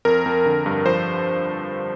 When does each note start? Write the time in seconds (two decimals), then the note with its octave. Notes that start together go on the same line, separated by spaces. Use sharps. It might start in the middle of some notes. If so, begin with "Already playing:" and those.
0.05 F2 A#4
0.26 F2
0.46 D3
0.66 G2
0.86 F3 C5